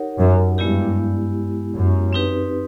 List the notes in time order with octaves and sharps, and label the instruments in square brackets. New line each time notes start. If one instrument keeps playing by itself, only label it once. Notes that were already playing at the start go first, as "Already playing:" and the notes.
Already playing: [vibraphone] D#4 G4 A#4 C#5 F#5
[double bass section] F#2
[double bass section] G2 [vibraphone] G#3 B3 E4 G4
[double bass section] F#2
[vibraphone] C4 D#4 G4 B4